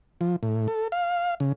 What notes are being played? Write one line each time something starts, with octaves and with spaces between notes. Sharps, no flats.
F3
A2
A4
F5
C#3